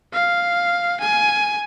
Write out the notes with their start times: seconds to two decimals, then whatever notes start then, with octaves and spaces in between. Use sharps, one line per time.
0.13 F5
1.00 G#5